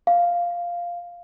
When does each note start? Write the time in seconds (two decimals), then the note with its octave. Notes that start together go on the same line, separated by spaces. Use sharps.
0.07 F5